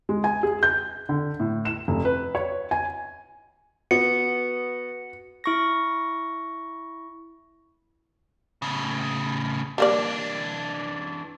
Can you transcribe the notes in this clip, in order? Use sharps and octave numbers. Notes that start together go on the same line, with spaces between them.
G#3
G#5
G#4
G6
D3
A2
E7
F1
B4
C#5
G#5
B3 F#4 C#7
E4 C#6 A#6
A2 C#3
E3 G3 A#3 D4 D5